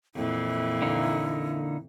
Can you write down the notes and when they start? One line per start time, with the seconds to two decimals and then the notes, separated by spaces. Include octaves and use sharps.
0.15 F2 A#2 E3 E4
0.82 D3 A#3 D#4